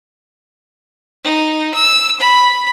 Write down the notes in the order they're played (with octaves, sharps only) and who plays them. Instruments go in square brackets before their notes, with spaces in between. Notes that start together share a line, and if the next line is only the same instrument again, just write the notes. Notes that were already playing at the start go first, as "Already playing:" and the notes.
[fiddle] D#4
E6
B5